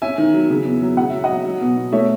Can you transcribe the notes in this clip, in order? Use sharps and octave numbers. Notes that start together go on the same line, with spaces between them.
C#4 E5 G#5
D#3
F#3
C#3
E2
F#3
C#3 F#5
F#3 E5
D#5 F#5
F#3
F#3
B2
B2
A3 C#5 E5